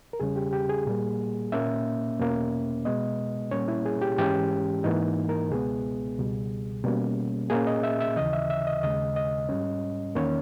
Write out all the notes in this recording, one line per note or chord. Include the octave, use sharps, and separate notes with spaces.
A#4
E2 C#3 G3 C#4 G#4
G4
G4
G#4
A#2 G3 A#3
A#2 A#3 C#4 E5
E2 B2 A#3 C#4
B2 G#3 B3 D#5
A#2 G3 A#3 C#4 C#5
E4
G#4
G4
G#2 E3 G#3 C#4 G4
G#2 E3 A#3 D#4
A#4
C#2 B2 G#3 B3 G#4
C#2 B2 G3
B2 G3 A#3 C#4
A#2 A#3 C#4 G#4
D#5
E5
E5
D#2 C#3 E3 D#5
E5
E5
D#5
D#2 C#3 G#3 D#5
D#5
G#2 G3 C#4
E2 D#3 A#3 C#4 C#5